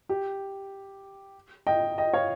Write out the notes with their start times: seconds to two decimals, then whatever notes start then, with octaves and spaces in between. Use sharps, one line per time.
0.09 G4
1.67 D#5 G5
1.98 D#5 G5
2.13 C#5 F5